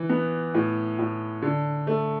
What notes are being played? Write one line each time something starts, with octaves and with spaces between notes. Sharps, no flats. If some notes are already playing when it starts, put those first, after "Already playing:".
Already playing: E3
B3
A2
A2
D3
A3